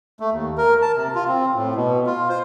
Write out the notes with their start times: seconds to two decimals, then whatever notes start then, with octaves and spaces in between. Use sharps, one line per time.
0.20 A3
0.32 D#2
0.58 A#4
0.82 A5
0.96 C3
1.15 F4
1.28 C4
1.55 A2
1.76 B2
2.06 F4
2.29 C5